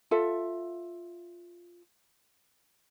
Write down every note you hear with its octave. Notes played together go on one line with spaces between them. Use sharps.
F4 A4 E5